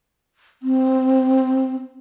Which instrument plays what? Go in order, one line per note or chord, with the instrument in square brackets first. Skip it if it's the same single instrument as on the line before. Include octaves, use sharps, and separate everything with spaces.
[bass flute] C4